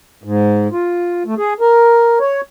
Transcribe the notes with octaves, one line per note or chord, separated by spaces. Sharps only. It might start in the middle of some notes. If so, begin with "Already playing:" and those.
G#2
F4
A3
G#4
A#4
C#5